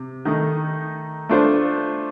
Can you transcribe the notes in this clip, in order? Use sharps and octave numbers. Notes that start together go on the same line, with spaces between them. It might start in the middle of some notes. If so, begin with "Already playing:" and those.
Already playing: C3
D#3 A3 D#4
A3 D4 F4 C5